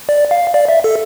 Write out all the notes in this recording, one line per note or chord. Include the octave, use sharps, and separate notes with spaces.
D5
F5
D5
E5
A4